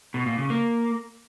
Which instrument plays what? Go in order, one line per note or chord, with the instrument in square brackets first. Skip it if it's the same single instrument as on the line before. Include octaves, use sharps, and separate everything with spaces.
[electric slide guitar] B2
A#2
C#3
A#3